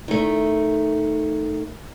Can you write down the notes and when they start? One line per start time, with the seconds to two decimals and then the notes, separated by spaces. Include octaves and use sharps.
0.08 D#3 A3